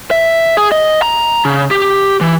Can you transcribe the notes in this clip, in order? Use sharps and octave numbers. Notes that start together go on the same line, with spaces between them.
E5
G#4
D#5
A#5
C#3
G4
E3